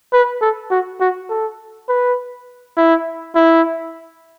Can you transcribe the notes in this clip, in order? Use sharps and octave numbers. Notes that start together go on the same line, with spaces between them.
B4
A4
F#4
F#4
A4
B4
E4
E4